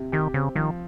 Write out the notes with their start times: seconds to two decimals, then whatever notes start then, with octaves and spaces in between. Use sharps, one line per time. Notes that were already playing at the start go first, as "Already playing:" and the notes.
Already playing: C3
0.12 D#3 G4
0.34 C#3 C4
0.55 D#3 F3